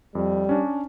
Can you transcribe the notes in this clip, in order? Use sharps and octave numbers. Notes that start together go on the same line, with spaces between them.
F2 G3
C#4 D4